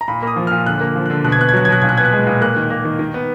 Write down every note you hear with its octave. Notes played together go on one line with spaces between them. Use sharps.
A#5
A#2 B5
A#3 D#6
F3
A#2 F6
D3 F#6
A#3
F3
D3 F#6
B2 F#6
G#6
B3 F#6
G#6
F#3 F#6
G#6
B2 F#6
A#2 G#6
F#6
B3 G#6
F#6
G#3
A#2
A#3 F#6
D#3
A#3
D#3
D#3
B3